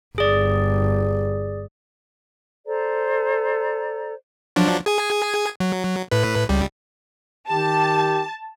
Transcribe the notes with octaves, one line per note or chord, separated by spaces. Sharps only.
G1 G#4 D5
A4 C5 D5 A#5
F3 F#3 D4
G#4 G#5
F#3
A2 B4
C#2 G3
D#3 G4 A5